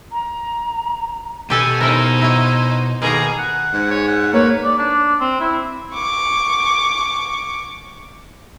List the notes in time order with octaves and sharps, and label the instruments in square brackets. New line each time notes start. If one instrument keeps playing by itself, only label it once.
[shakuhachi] A#5
[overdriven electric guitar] B2 [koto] G4 A4 A5 [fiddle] G#5
[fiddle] D#4 C5 [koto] E4 A#4
[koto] E4 C#5
[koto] B2 D#3 A#3 [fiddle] G#4 A#5
[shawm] F#5
[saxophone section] G#2
[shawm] C#5
F#5
[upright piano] A#3 [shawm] B4 [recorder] C#5
[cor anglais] D5
D4
C4
E4
[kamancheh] C#6 D6